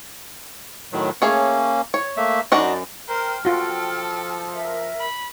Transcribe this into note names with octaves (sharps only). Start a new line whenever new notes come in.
A2 D#3 F#3
A3 A#3 C#4 G#4 C#5
C#5
A3 A#3 E5
F#2 D4 D#4 F#4
A#4 C5 G5 F6
F3 F4 F#4 A4
A#4 E5
B5